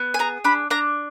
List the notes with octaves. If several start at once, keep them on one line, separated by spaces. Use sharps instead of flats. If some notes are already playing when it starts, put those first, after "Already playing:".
Already playing: B3
G#5
G#4 A#5
D4 B5
D4 A#5